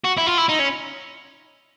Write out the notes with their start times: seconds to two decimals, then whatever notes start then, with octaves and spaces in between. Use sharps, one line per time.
0.05 F#4
0.18 E4
0.27 F4
0.38 E4
0.49 D#4
0.60 C#4